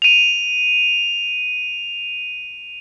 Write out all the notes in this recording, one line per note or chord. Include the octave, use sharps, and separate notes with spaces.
D#7 F7